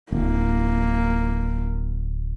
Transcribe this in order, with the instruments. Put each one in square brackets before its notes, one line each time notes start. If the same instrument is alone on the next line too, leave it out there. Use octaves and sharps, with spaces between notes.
[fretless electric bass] D1 [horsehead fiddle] A#3